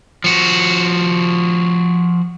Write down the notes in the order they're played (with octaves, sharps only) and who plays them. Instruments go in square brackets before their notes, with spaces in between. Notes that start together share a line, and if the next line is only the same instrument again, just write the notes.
[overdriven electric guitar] F3 F#4